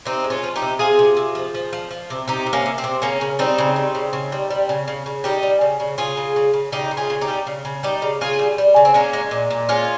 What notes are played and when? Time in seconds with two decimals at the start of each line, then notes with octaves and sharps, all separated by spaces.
0.05 C3 C4 D#4
0.24 G#3
0.30 C#4 F4
0.43 F3
0.56 D#4 G4
0.62 C3
0.79 C3 F4 G#4
0.99 C3
1.17 C3
1.35 F3
1.54 F3
1.73 F3
1.91 F3
2.10 C3
2.28 C3 D#4 G4
2.46 C3
2.53 A#3 C#4
2.66 C3
2.78 C4
2.84 C3
3.02 C#3 A#3 C#4
3.21 C#3
3.39 G3 C4 D#4
3.58 C#3
3.76 G3
3.95 C#3
4.13 C#3
4.32 G3
4.50 G3
4.69 C#3
4.88 C#3
5.06 C#3
5.24 G3 D#4 G4
5.43 G3
5.61 C#3
5.80 C#3
5.98 C#3 F4 G#4
6.17 C#3
6.36 C#3
6.54 C#3
6.72 C#3 D#4 G4
6.91 C#3
6.97 F4 G#4
7.10 C#3
7.21 D#4 G4
7.28 G3
7.47 C#3
7.65 C#3
7.83 G3 D#4 G4
8.02 C#3
8.21 C#3 F4 G#4
8.39 G3
8.58 G3
8.76 C#3
8.85 C4
8.94 G#3 A#3 C#4
9.13 G#3
9.31 A#2
9.50 A#2
9.69 G#3 C#4 F4